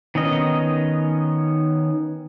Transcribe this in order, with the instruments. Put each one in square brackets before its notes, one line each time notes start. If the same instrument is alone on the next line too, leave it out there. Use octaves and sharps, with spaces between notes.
[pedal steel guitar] D#3 B3 C#4 D#5